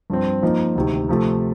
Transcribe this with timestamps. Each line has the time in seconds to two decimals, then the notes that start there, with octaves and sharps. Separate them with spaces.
0.10 G2 F3 C4
0.43 F3 A#3 D#4
0.75 D2 C3 D#3
1.09 C3 F3 A3